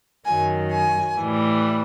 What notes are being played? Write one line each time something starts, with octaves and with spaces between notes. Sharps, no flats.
F#2 D#3 F#3 G#5
G#5
A2 E3 G3